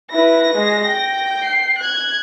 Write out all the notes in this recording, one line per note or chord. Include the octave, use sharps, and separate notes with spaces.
E4 B4 A#6
G#3
G5
C7
F#6 G#6